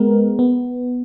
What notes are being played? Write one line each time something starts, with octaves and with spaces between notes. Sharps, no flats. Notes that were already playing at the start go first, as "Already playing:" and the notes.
Already playing: G#3 B3 A#4
B3